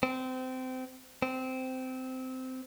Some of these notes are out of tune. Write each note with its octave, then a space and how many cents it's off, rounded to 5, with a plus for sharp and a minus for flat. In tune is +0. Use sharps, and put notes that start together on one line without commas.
C4 -25
C4 -15